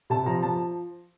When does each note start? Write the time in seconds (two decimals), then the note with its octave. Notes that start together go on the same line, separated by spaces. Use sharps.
0.10 C3 A5
0.26 F3 A#5
0.43 F3 A5